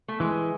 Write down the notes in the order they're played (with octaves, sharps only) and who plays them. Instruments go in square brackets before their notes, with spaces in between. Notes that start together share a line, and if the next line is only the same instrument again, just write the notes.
[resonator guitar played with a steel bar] A3
[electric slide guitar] E3 [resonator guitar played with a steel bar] G#3